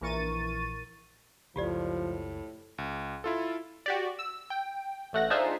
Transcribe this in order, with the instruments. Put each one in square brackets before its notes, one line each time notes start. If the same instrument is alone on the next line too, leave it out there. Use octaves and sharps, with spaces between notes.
[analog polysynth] A#1 E3 A#4 C#6 A6 D#7
[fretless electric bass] F#1 C#2 [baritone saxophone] A2 [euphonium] F3 [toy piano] F4 G4 D5
[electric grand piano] C#2
E4 F4 A4
[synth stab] F#4 G4 D5
E6
G5
A1 A3 F#5 A#6
D4 D#4 F4 G#4 C5 E5